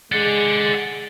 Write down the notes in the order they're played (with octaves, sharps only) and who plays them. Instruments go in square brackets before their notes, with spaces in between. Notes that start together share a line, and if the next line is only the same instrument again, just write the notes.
[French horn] G#3 [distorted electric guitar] D5 F#5